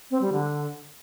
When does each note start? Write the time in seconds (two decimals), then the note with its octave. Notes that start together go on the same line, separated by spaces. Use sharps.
0.11 C4
0.22 G3
0.33 D3